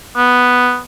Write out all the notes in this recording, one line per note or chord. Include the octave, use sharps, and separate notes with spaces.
B3